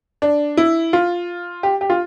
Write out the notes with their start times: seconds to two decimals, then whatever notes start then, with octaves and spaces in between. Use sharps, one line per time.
0.22 D4
0.57 E4
0.93 F4
1.63 G4
1.81 G4
1.90 F4